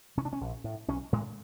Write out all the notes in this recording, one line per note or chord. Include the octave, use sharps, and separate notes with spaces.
C3 C#4
D4
C#4
A#1
A2
B1 C#4
A2 G#3